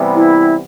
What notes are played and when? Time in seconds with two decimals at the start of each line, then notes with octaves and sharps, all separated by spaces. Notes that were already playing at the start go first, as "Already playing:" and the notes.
Already playing: C3 E3 G3 B3
0.16 E4